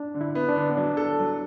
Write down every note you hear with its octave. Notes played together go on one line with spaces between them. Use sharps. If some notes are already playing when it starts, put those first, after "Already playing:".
Already playing: D4
D3
E4
B3
D4
D3
B3
F#3 D4
A4
F#3